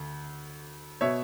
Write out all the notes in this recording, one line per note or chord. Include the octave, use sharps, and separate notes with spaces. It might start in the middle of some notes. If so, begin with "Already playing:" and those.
Already playing: D2
B2 C#5 E5